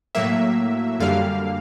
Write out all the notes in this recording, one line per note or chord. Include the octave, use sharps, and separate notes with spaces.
A2 F#3 A#3 E5
F#2 D3 G3 A#3 F5